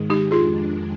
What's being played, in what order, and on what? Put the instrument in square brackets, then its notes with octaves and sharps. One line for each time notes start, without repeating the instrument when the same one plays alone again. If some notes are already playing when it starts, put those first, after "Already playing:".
Already playing: [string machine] G#2 D#3 G#3
[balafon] D#4 G4
[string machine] F2 D#3 G#3 D4 [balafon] F4 G#4